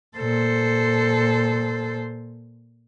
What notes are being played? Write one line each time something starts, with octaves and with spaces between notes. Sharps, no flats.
A#2 A4 C5